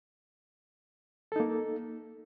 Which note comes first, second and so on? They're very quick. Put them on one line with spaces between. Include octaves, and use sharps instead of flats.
A4 D#4 A#3